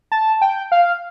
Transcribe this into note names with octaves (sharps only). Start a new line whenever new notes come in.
A5
G5
F5